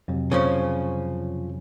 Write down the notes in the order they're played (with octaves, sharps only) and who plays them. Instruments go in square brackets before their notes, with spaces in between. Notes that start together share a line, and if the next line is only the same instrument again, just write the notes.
[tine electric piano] F2 C3 F#3
[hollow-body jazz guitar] C#3 F3 C#4